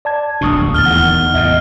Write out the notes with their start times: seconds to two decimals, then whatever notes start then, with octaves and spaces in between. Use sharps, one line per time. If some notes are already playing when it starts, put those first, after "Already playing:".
0.05 D5 A5 G#6
0.41 D1 A#1 B2 D4 C#6 D#6
0.75 D#2 F6 A6 G7
0.86 E2 D3 D#3 F#5
1.34 E2 A2 C3 D#5 E5